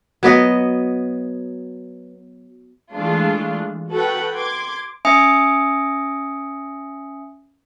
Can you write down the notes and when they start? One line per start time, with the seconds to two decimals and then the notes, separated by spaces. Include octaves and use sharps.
0.23 F#3 B3 D#5
2.93 E3 G#3 A3 D4 F4
3.91 F#4 A4 B4 F#5 G5
4.36 C6 D6 G#6
5.05 C#4 E5 G#5 D#6 C#7